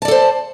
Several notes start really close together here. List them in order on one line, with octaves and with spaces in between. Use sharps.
A5 D5 A4 C5